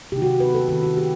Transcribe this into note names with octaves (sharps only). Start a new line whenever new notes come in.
C3 D#3 A3 D#4 G4
F#4
B4
A4
D#3 A3 C4 E4 A4
F#4
G4